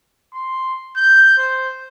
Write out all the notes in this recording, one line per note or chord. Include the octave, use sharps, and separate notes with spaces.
C6
G6
C5